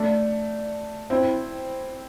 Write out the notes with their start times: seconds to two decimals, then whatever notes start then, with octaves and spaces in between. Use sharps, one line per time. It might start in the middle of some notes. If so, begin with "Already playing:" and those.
Already playing: A3 D4
1.10 C4 E4